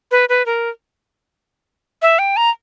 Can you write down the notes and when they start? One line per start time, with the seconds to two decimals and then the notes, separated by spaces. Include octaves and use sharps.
0.11 B4
0.29 B4
0.46 A#4
2.02 E5
2.19 G5
2.37 A#5